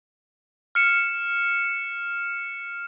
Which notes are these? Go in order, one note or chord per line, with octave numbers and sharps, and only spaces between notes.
F6 C#7 E7